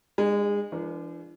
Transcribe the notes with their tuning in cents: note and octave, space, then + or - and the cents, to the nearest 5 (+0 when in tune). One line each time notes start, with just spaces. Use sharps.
G#3 -25 D4 +30
E3 +45 D4 +0 A#4 +10